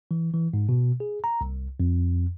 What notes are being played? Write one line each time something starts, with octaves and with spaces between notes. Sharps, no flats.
E3
E3
G#2
B2
G#4
A#5
C2
F2